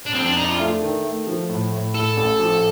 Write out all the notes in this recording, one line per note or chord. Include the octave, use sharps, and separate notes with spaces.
D4
F2 C4
D4
D4 D#4
F4
A3
D#3
A3
F3
A2
A2
A2 A4
A1
F3